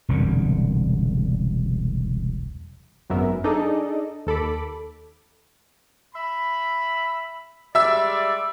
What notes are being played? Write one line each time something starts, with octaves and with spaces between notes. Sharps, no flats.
E1 C2 F#2 D3
G#1 F#2 F#3 B3 A#4 E5
D4 D#4 G#4 A4 D5 D#5
D#2 A4 B5 D6
E5 B5
G3 G#3 D5 E5 E6